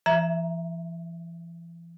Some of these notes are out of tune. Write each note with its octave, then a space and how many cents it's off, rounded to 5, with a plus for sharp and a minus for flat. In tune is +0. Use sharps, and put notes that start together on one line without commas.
E3 +40 E5 +0 A#5 +5